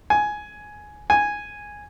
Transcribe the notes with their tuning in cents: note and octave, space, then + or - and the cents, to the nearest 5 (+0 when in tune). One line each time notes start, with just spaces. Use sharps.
G#5 +10
G#5 -5